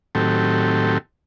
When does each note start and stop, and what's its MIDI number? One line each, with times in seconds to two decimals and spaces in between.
0.15 0.98 45
0.15 0.98 51
0.15 0.98 54
0.15 0.98 60
0.15 0.98 67
0.15 0.98 69